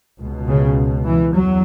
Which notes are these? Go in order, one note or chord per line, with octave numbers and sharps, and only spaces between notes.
C#2 B2
C#3
E3
E2 F#3